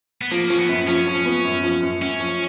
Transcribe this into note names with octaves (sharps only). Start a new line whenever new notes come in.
B3
F3 A#3
F3 C#4
B3
F#2
F3 C#4
F3
B3
F#2
F3
F#2
F#2 C#4
F3